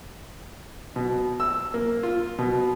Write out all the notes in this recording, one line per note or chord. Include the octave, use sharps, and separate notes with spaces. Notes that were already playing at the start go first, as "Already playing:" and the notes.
B2
E6
A#3
F4
B2